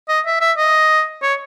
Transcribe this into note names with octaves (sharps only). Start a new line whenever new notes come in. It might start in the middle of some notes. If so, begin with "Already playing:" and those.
D#5
E5
E5
D#5
C#5